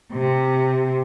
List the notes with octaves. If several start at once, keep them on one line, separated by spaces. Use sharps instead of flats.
C3